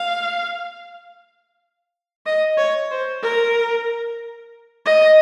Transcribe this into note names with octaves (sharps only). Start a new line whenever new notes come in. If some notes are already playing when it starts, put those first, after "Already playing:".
Already playing: F5
D#5
C#5
C5
A#4
D#5